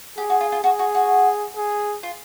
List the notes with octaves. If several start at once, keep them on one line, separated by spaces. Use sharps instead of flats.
G4 G#4
F#4
F4
F4
F#4 G#4
F#4
F#4
G#4
F4